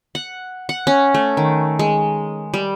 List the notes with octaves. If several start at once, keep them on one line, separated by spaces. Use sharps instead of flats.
F#5
F#5
C#4
A3
D#3
G#3
G3